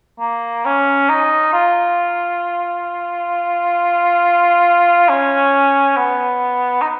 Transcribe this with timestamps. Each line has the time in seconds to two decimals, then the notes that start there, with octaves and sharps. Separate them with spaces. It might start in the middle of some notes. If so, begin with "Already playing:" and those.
0.20 A#3
0.65 C#4
1.09 D#4
1.53 F4
5.09 C#4
5.97 B3
6.82 D#4